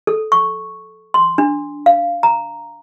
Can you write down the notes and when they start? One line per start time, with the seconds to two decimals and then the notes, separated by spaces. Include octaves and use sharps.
0.07 A4
0.32 C#6
1.14 C6
1.38 D4
1.86 F5
2.23 A#5